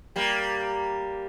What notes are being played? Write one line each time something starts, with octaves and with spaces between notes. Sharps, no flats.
G3 A#3